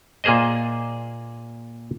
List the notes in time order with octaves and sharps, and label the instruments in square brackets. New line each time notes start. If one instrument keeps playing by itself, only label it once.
[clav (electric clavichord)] A#2 A#3 G#4 C5 D#5